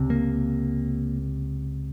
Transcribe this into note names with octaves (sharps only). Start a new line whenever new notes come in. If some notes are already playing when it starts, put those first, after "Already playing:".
Already playing: C#2 C3
A#3